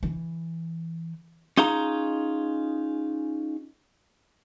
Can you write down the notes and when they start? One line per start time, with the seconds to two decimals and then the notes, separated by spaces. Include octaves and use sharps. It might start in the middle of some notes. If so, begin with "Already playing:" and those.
0.03 E3
1.58 C#4 D#4 F4 G#4 A#5